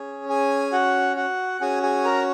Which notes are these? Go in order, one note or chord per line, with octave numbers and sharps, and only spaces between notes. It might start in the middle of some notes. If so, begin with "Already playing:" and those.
Already playing: C#4 G#4
G#4 G#5
F#4 F#5
F#4 F#5
C#4 F#4 G#4 G#5
G#4 G#5
A#4 A#5